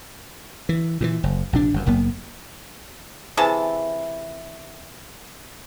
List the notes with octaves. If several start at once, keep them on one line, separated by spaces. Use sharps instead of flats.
E3
A#2 C#3 E3
F#1
A#1 C3 D4
G1 F#2
F#1 F#2 A#3 B3
C3 E3 G#4 A5